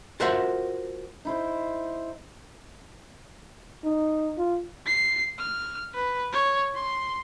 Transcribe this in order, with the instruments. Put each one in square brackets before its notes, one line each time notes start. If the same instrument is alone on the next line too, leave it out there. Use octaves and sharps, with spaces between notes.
[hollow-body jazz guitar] F4 F#4 A#4 C5 E5 F#5
[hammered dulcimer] D#4 E4 C5
[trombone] D#4
F4
[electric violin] C7
F6
B4
C#5
C6